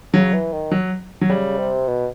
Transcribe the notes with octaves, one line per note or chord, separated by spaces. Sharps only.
C#3 F#3
E3
D#3
F#3
F#3
C#3 G3
C3
B2